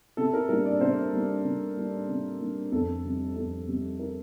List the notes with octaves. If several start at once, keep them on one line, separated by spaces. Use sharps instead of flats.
C3 A4
A#4
G3 A#3 D4 A#4
D5
C3 C5
G3 A#3 D4
C3
G3 A#3 D4
C3
G3 A#3 D4
F2 A4
C3 G3
F2 A4
C3 G3
A#4